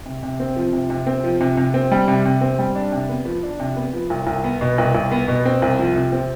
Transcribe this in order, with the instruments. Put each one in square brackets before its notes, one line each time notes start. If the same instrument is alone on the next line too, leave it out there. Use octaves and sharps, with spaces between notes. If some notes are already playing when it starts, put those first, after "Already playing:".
[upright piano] C3
C3
C4
F3
C3
C3
C4
F3
C3
C3
C4
G3
C3
C3
C4
G3
D4
C3
B3
F3
D4
C3
B3
F3
C2
C2
B3
B2
C2
C2
B3
B2
C4
C2
F3
C3
C4